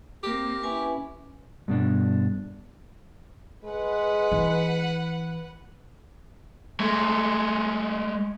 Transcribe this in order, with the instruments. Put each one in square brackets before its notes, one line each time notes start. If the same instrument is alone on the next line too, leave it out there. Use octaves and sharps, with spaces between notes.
[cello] A#3 C4 [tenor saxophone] G4
[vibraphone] C#4 B4 G#5 [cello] E4
[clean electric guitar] G2 B2 D4
[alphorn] G#3 [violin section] B4 F#5
[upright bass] E3
[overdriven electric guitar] G#3 A3